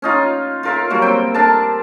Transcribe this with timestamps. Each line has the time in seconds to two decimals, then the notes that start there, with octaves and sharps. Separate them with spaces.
0.02 C#4 D#4 F4
0.63 F4 A#4 E5
0.90 F#3 G3 A#3 F#4
1.02 C4 G5
1.34 D4 A#4 A5